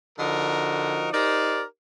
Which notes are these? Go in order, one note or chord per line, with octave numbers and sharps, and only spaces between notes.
D3 F3 D#4 F#4 A#4
D#4 G4 A#4 C5 D5